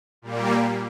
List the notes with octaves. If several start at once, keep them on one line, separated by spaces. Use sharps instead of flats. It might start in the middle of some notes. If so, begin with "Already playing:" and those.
A#2 G3 A#3